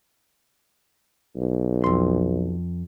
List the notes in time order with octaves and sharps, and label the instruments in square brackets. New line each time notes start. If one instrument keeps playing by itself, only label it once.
[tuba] B1
[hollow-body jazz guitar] F2 C6